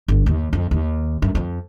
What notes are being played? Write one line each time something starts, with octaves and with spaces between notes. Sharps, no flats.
G1
D#2
F2
D#2
F#2
F2